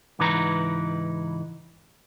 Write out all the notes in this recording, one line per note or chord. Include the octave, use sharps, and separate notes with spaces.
C#2 G#2 E3 D#4 B4 A#5